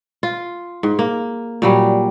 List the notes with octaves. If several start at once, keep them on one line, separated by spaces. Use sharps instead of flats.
F4
G#2
A#3
A#2 F#3 G3